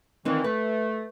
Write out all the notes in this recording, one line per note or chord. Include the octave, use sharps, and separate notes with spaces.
A#2 D#3 E3 C4 D#4
A3 B4